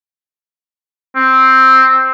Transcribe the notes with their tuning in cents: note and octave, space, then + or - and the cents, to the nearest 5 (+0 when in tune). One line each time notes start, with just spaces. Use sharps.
C4 +5